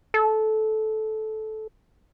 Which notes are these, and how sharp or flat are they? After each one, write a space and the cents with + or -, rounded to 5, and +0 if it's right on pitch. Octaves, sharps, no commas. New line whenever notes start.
A4 -15